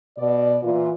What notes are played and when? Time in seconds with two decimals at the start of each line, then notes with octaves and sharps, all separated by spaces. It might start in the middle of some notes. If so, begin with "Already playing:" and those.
0.18 B2 D5
0.63 A#2 E3 F4